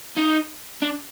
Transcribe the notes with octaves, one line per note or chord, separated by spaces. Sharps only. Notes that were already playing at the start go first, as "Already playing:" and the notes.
D#4
D4